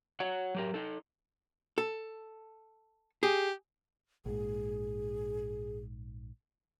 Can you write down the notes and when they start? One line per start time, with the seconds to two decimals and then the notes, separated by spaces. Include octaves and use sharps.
0.20 F#4 C#5 F#5
0.55 F#3 G4 A#4
0.74 D#4 A4
1.78 A4
3.23 G4 G#4
4.26 A#1 G#2 G#4